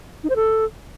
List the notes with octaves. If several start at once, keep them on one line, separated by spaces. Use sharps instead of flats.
D#4
C5
A4